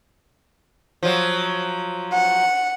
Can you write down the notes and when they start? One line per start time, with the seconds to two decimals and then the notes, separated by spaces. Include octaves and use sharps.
1.03 F3 F#3
2.11 F#5